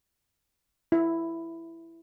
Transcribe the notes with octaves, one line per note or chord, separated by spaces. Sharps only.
E4